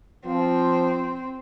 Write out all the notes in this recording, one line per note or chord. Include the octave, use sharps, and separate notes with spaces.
F3 C4